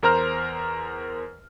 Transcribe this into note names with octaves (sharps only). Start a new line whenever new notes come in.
E2 A#4 C5 A#5 F6